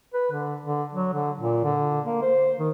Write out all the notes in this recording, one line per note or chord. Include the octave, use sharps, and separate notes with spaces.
B4
D3
D3
F#3
D3
A#2
D3
A#3
C5
D#3